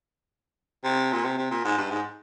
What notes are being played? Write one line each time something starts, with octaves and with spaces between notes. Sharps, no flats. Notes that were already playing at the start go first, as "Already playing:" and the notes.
C3
A#2
C3
C3
A#2
G#2
G2
G#2